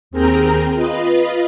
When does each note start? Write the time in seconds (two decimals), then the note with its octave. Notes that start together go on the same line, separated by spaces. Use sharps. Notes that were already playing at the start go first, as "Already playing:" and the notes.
0.11 D#2 C4 G#4 A#4 G5 A#5
0.74 F4 B4 D#5